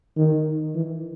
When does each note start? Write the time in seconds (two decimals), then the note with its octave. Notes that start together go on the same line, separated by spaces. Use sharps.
0.17 D#3
0.75 E3